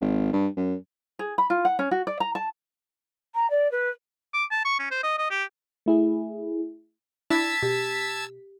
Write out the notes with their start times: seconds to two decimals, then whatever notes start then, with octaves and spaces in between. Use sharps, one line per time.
0.01 G#1
0.33 G2
0.57 F#2
1.19 G#4
1.38 B5
1.50 F4
1.65 F#5
1.79 C#4
1.91 F#4
2.07 D5
2.20 A#5
2.35 A5
3.34 A#5
3.50 D5
3.71 B4
4.34 D6
4.51 A5
4.65 C#6
4.80 C#4
4.91 C5
5.03 D#5
5.19 D#5
5.31 G4
5.86 A3 E4 G#4
7.30 D4 E4 A5 E6 G#6 B6
7.62 B2 G4